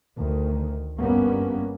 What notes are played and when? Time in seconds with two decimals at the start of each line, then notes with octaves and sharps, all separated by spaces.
0.18 D2 D#3
1.00 G1 G2 G3 A#3 B3 C#4